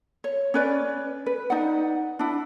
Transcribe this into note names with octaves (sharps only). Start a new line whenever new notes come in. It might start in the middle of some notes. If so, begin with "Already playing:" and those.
C#5
C#4 B4 D5
B4
D#4 D5 F#5
D4 E4